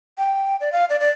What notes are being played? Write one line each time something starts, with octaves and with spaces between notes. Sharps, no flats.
G5
D5
F5
D5
D5